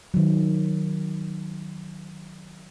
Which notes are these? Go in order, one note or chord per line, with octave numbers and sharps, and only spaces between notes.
D#3 F#3